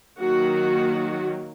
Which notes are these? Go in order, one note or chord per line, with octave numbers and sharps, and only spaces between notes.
D#3 F#3 A#3 F#4